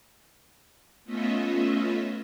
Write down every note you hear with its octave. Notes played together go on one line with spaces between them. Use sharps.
A3 B3 C#4 F4 D#5 E5